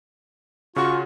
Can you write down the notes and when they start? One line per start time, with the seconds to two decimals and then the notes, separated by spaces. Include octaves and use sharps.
0.76 C#3 F4 F#4 C#6